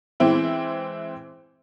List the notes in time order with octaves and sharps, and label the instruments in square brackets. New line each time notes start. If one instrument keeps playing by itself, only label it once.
[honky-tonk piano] E3 G#3 C4 E4